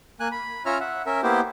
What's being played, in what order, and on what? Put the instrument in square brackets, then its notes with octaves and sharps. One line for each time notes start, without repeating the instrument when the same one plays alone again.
[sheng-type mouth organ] A#3 G#5 F#6
B5
C#4 F4 C#5 E5 A#5 F6
E5 F#5
C#4 A#4 E5
A#3 B3 E4 G4 C5